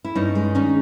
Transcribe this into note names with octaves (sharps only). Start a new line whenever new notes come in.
E4
G2 C#4 D#4
G#3
D#3 C#4 D#4